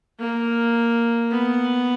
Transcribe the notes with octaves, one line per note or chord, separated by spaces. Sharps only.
A#3
B3